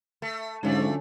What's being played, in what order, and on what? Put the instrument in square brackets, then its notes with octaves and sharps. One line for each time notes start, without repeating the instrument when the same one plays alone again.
[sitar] A3
[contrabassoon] G#2 [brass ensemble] D3 F#3 C#4 [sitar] F3 A3 D5